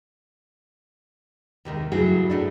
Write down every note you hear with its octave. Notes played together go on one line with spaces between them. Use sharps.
D#2 C3 D#3 G#3
G2 C#3 F#3 A3 E4 G#4
A2 A3 D4